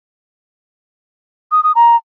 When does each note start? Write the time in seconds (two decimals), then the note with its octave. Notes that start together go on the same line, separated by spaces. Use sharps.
1.52 D#6
1.63 D#6
1.75 A#5